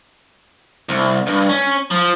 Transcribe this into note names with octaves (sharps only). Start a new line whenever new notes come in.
C2
G2
C#4
F3